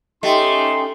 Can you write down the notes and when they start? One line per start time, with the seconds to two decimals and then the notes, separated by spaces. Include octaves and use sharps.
0.23 A3 C#4 D#4 G4 D#5 E5 G5 C6